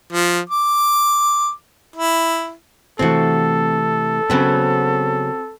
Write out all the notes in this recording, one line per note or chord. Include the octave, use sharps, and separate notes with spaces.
F3
D6
E4
C3 E3 A3 C4 F#4 A4
C#3 F#3 B3 C4 F#4